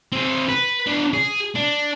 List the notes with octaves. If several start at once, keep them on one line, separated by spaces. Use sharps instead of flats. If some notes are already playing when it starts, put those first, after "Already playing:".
C4 G#4
B4
B3 D4
G#4
D4